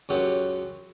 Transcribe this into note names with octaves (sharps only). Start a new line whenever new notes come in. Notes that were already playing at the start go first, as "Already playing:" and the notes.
C#2 F#2 F#3 C#4 G4 F#5